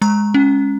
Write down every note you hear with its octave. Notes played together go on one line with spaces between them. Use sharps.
G#3 A#5
C#4